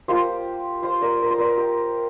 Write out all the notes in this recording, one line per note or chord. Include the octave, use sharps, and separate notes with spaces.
A#3 F4 G4 C5
C5 F5
A#4 D5
A#4
C5
A#4 D5
G4